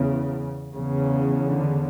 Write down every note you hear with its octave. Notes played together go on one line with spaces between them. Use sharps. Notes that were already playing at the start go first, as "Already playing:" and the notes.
Already playing: E2 C#3
E2 C#3
D3